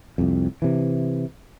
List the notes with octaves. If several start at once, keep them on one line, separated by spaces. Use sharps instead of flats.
C2 F2
C3 E3